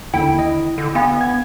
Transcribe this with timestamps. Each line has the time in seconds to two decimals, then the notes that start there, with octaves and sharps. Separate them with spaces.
0.14 D#2 D3 E4 G5
0.39 D#5
0.78 D3
0.95 B3 D4 F5 B5
1.21 G#6